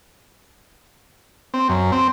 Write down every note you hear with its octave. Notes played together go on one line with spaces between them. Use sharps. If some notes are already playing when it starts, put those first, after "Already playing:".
C4
F#2
C4